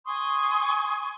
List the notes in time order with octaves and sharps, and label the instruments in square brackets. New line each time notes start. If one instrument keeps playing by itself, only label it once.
[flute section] G#5 C6 C#6 D#6